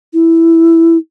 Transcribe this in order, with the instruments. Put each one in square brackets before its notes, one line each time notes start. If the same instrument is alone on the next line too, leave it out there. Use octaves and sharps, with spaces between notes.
[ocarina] E4